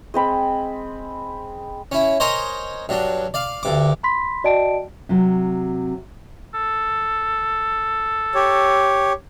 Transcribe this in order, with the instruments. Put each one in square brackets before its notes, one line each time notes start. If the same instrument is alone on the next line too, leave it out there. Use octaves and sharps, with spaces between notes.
[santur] G#3 C4 B5
[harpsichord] C#4 E4
A#4 C5 C#5 D#5 G#5 A#5
G2 F#3 D4
D5 F5
D2 G2 D6
[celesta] B5 C6 B6
F#4 D5 D#5 G5 A5 D7
[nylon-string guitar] C3 F#3
[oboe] A4
[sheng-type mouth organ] G4 C#5